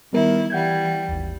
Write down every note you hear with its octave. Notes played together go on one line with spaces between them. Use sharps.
D#3 G3 B3 E4 A#4
E3 G3 F#5 G6 G#6
G#1 D#2